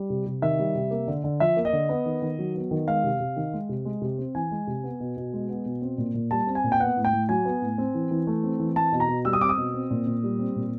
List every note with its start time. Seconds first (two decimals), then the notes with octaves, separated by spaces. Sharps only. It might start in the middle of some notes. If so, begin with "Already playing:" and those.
Already playing: G3
0.10 C3
0.26 C3
0.42 D#3 E5
0.59 G3
0.75 C3
0.91 A#3
1.08 D3
1.24 D3
1.40 F3 E5
1.57 A#3
1.65 D#5
1.73 D3
1.89 B3
2.05 D#3
2.22 D#3
2.39 F#3
2.55 B3
2.71 D#3
2.88 G#3 F5
3.04 C3
3.20 C3
3.36 D#3
3.53 G#3
3.69 C3
3.85 G#3
4.02 C3
4.19 C4
4.35 E3 G#5
4.51 G#3
4.67 C3
4.84 B3
5.00 B2
5.17 B2
5.33 G#3
5.49 B3
5.66 B2
5.82 C4
5.98 A#2
6.14 A#2
6.31 G3 A5
6.47 C4
6.55 G#5
6.64 A#2
6.72 G5
6.80 B3 F#5
6.97 A2
7.05 G5
7.12 A2
7.29 F#3 G#5
7.45 B3
7.62 A2
7.78 C4
7.94 E3
8.11 E3
8.27 A3
8.43 C4
8.60 E3
8.76 C4 A5
8.92 B2
9.00 A#5
9.09 B2
9.25 G3 E6
9.33 D#6
9.41 C4 D6
9.49 D#6
9.57 B2
9.74 C4
9.90 A#2
10.07 A#2
10.23 G3
10.39 C4
10.56 A#2